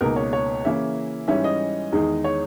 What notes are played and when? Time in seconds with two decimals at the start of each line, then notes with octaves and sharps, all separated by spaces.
0.01 C#2 B2 A#3 D#4 A#4
0.16 C#5
0.33 C#5
0.65 C#3 E3 A#3 C#4 E4 E5
1.28 G#2 E3 G3 C#4 E5
1.44 D#5
1.92 E2 D#3 G#3 D#4
2.24 C#5